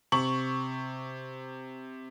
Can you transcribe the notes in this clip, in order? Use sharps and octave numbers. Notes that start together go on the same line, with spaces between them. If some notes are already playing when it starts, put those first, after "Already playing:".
C3 C#6 F#7